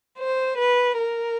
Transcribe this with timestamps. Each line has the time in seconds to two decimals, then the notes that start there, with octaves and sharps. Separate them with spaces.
0.20 C5
0.58 B4
0.97 A#4